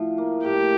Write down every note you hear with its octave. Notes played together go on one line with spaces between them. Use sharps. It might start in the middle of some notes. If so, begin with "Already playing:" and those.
Already playing: A2 F3
A#3
A2 G4